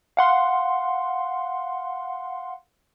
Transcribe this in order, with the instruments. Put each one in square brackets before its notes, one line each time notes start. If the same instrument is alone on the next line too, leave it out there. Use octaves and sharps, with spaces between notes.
[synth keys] F5 F#5 C6